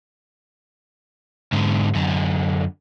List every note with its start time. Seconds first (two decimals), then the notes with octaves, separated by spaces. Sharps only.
1.52 G#2 D3
1.95 F#2 D3